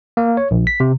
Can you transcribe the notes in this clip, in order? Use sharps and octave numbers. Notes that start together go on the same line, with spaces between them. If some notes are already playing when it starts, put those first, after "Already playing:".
A#3
C#5
A#1
B6
C3